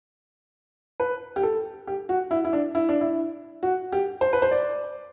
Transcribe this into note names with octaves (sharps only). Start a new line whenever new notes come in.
B4
G4
A4
G4
F#4
E4
E4
D4
E4
D4
E4
F#4
G4
C5
B4
C5
D5